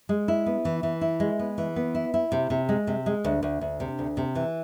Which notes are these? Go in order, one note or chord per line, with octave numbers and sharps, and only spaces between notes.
G#3
E4
B3
E3
E3
E4
G#3
B3
E3
B3
E4
E4
C3
C3
G#3
C3
G#3
D2
D2
D2
C3
D2
C3
E3